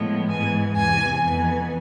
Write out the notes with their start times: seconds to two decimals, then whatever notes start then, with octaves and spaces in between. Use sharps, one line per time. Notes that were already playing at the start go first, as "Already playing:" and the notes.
Already playing: A2 F3 G#3 B3
0.30 G#2 E3 B3 G#5
0.75 E2 C3 E3 G#5
1.21 F2 E3 B3